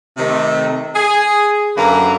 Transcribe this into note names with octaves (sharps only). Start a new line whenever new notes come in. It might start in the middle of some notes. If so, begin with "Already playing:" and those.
C3 D#3 A3
G#4
F#2 D3 F#3 A#3 B4 A#5